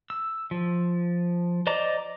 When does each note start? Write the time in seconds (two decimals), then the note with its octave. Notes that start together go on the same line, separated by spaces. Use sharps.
0.10 E6
0.51 F3
1.67 C5 D5 D#5 A#5 D6